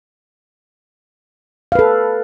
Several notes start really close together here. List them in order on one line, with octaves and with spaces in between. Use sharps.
F5 B4 A4